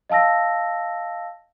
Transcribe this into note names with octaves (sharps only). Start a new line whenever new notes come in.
D#5 F5 A5 E6 A#6